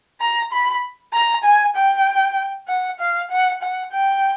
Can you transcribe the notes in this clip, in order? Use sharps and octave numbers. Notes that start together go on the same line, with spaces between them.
A#5
B5
A#5
G#5
G5
F#5
F5
F#5
F#5
G5